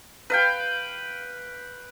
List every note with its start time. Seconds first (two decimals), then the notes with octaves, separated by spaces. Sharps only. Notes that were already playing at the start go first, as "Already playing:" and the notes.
0.30 B4 F5 G5